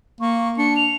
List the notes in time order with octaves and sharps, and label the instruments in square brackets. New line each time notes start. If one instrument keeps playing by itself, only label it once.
[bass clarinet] A#3 [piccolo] C#6
[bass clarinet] D4 [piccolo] C#7
[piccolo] F7